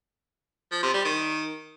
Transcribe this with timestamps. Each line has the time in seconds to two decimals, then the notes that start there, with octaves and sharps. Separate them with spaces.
0.72 F3
0.83 C3
0.94 G3
1.05 D#3